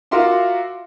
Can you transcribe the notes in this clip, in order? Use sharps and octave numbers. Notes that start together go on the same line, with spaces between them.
F4 F#4 A#4 E5 C6 D6